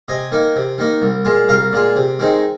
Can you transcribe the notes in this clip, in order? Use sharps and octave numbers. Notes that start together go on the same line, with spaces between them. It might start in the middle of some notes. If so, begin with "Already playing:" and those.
C3 D#5 G#5
D#3 A#3 D#4
C3
D#3 A#3 D#4
C2
A#2 G#3 F4
C2 F5 A#5
A#2 G#3 F4
C3
D#3 G#3 C4 D#4